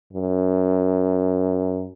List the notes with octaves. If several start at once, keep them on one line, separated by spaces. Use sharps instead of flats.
F#2